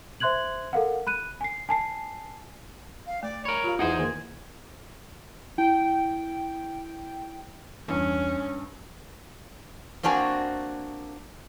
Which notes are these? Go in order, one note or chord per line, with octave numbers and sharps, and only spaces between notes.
C5 E5 C6 F#6 G#6 F#7
A4 A#4 F5 F#5
B5 F#6 D#7
G#5 C7
G#5 A5 C7
F5
A3 D5
A#4 C#5 B5
F4 G4 F5 B5
E2 D#4 E4 G#4 C5 E5 F#5 G#6
D#3 A#3 A#4
E4 G5
E2 G2 C#4
A#3 C4 D4 F#4 G#5